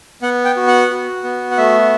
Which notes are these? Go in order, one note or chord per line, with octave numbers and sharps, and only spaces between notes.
B3 F#5
G5
F#4
F#5
F#4
B3
F#5
A3 E5